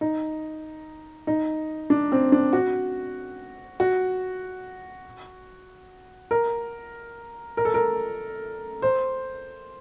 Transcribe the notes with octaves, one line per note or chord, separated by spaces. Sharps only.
D#4
D#4
D4
C4
D4
F#4
F#4
A#4
A#4
A4
A#4
C5